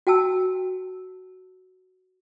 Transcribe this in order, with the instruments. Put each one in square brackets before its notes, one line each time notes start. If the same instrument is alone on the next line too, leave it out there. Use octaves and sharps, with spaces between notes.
[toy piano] F#4 G5 A5 E6